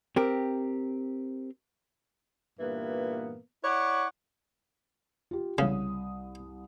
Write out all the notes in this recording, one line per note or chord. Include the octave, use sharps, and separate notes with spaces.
C4 G4 A#4
G2 A#2 E3 A#3 B3
E4 C#5 D5 F#5
F4 G4
C2 C#3 D#6